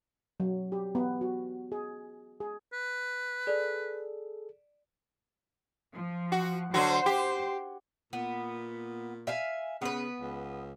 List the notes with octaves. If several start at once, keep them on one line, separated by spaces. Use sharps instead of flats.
F#3
G4
B3
F#4
G#4
G#4
B4
G#4 A4 D5
F3
F#4
D3 F#3 F#4 C5
G4
A#2 B3
E5 F5 G#5
C#3 B3 B4
C#2